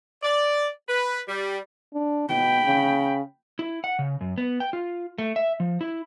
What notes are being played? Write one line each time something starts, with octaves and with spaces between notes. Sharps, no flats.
D5
B4
G3
D4
B2 G5 B5
C#3
E4
F#5
C#3
F#2
B3
G5
F4
A3
E5
F3
E4